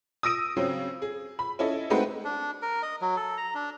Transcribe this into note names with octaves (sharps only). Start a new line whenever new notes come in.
D#6 E6 A#6 D7 D#7
C#3 F#3 C4
G#4
B5
C#4 E4 A4 D#5
G#3 A3 C4 D#4 F#4 B4
D4
A#4
D#5
F#3
A4
A#5
D4